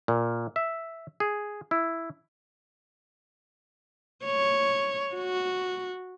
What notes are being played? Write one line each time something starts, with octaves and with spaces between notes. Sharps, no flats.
A#2
E5
G#4
E4
C#5
F#4